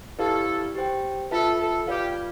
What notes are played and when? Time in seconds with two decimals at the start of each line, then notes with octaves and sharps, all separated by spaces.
0.19 E4 G4 A4 B4 D5 F5
0.75 G4 C5 G5
1.31 F4 A4 B4 E5 A5
1.60 A4
1.87 F4 G4 B4 D5 F5